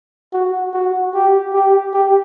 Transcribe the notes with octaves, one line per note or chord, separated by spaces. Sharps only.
F#4
F#4
G4
G4
G4